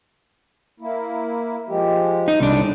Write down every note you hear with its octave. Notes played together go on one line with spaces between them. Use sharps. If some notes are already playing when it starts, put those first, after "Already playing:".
A#3 E4
F3 G#3 G4
D#4
C2 A2 E3 B3 D4